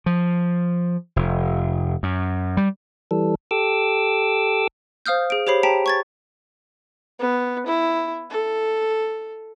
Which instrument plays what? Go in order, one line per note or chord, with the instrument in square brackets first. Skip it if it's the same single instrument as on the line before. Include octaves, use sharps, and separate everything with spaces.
[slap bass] F3
F1
F#2
G3
[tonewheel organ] E3 G3 A4
G4 A4 D6 E6
[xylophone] C5 F5 D#6 F6 G6
G#4 D7
G4 C5 C#5 B5 C7
G4 G5 A5 A#5 B6 D7
C#6 G#6 A6
[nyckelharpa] B3
E4
A4